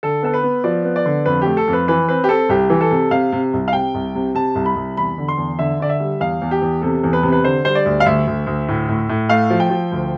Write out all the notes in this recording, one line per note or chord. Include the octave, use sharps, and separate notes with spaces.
D3 A4
B3 A4
B4
B3
F3 D5
B3
D5
D3
F2 B4
A3 G4
A4
F2
B4
E3 B4
C4 B4
G4
C4 A4
C2 G4
E3
A4
C3
C3 F5
C3
C2
F5
C3 G5
C2
C3
C3 A5
C2
B5
C2
E2 B5
D3
C6
E2
D3 E5
D3 D5
E5
G3
E2 F5
E2
G4
E2
C3 A4
E2
B4
C3
B4
D3 C5
G3 C5
D5
D2
F5
D2 E5
D2
D2
A2
A2
A2
A3 F5
F3
G5
F3
D2